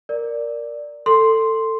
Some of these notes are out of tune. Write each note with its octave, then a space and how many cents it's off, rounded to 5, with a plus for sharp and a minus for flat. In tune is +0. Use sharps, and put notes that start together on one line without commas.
A#4 +0 D5 +0
A4 +20 C6 +0